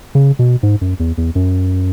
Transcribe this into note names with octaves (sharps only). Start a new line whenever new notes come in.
C#3
B2
G#2
F#2
E2
E2
F#2